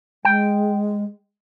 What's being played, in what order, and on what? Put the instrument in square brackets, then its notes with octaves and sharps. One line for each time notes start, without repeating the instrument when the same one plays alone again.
[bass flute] G#3 [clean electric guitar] G5